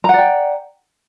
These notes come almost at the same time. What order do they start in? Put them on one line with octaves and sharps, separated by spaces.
A#5 F#5 D5 G5